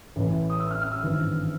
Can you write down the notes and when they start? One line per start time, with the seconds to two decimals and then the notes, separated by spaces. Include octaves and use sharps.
0.16 A1 A2 E3
0.50 D#6
0.60 E6
0.71 F6
0.82 F6
0.92 E6
1.03 G#1 G2 E3